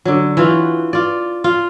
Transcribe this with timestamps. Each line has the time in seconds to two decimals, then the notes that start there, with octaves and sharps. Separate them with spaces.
0.05 D3 F#3
0.37 E3 F4 F#4
0.93 F4 D5
1.44 F4